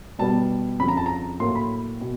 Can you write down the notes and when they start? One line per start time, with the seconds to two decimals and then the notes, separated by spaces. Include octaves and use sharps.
0.19 B2 G3 B3 A5
0.79 F2 C#3 F3 B5
0.88 A#5
0.97 A5
1.06 A#5
1.40 A2 F#3 A#3 C6
1.55 B5
2.01 B2